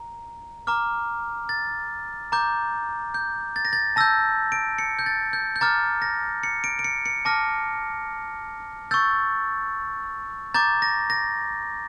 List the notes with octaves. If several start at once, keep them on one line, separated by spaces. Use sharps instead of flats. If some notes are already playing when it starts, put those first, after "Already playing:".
Already playing: A#5
A#5 D6 F6
A6
A#5 D6 G6
G6
A6
A#6
A6
A5 E6 G6 A#6
D7
C#7
G6
A6
G6
G6
A#5 D6 F6 A6
A#6
C#7
D7
D7
C#7
C#7
A5 D6 F6 A#6
C#6 E6 G6 A6
A#5 D6 G6 A6
A#6
A#6